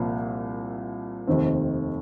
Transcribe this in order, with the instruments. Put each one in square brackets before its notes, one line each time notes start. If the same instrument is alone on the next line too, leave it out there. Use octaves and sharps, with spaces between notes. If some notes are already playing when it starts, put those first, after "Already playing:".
Already playing: [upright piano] C2 A#2 F3 A#3
F1 D#2 D#3 C4